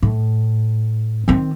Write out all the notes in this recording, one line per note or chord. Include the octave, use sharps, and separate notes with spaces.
A2
D#3 C4